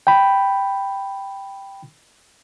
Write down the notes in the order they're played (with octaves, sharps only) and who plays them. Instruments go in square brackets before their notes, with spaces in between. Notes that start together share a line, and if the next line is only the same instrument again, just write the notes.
[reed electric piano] G5 B5